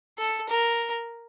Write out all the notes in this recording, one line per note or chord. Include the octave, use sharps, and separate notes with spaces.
A4
A#4